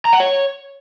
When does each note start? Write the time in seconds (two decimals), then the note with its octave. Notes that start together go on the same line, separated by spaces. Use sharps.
0.05 A#5
0.13 F#5
0.20 C#5